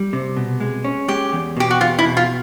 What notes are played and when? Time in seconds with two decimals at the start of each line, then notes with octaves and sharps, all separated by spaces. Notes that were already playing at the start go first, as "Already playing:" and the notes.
Already playing: G3
0.13 C3
0.37 B2
0.60 G#3
0.84 C#4
1.09 G#3 G4
1.33 E2
1.57 B2 G4
1.71 F#4
1.81 E2 F4
1.99 E4
2.05 B2
2.17 F4